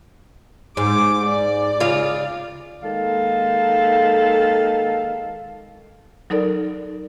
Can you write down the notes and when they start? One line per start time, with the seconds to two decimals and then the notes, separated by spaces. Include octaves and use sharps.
0.77 G#2 D6
1.27 D5
1.80 C#3 F4 F5
2.83 D#3 G#3 A#3 A4 F5
6.30 F#3 D#4 A4 A#4 D5